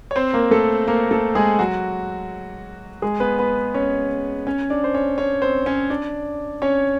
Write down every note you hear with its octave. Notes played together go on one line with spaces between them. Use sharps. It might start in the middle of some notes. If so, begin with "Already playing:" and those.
C#5
C4 C5
A#3 A#4
A3 A4
A#3 A#4
A3 A4
G#3 G#4
F#3 F#4
G#3 G#4
B3 B4
B3 B4
C#4 C#5
C#4 C#5
D4 D5
C5
C#4 C#5
C#4 C#5
C4 C5
C#4 C#5
D4 D5
C#4 C#5